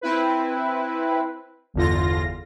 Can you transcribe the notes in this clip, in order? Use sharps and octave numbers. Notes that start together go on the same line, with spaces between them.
C4 E4 B4
G1 E2 D3 F4 A#6